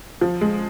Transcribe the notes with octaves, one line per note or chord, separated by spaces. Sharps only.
F3
G#3